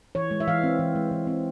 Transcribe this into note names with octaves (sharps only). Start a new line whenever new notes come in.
E3 C#5
G#3
E5
E3 F5
C4
E3
G#3
E3
C4